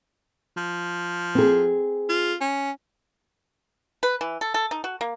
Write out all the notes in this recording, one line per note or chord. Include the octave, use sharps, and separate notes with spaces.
F3
C4 G#4
F4
C#4
B4
E3
A4
A4
D#4
F#4
A#3